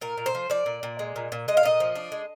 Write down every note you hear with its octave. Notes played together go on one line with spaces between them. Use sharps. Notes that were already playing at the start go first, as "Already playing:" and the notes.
A#2 A#4
A#2
C5
F3
F3 D5
A#2
A#2
G#3
A#2
A#2
G#3 D#5
F5
A#2 D#5
F3
D4
G#3